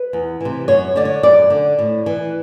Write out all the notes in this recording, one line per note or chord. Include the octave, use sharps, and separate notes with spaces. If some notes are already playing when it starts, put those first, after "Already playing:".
Already playing: B4
E2
C3 E3
F#2 C#5
D3 D5
C#5
F#2 D5
D3
A2
E3